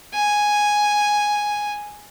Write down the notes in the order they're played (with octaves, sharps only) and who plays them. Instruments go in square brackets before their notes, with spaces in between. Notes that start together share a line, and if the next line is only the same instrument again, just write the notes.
[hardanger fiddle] G#5